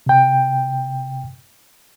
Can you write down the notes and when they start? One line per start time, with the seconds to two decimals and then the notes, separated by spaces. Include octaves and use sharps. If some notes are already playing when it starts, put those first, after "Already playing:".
0.06 C3 G5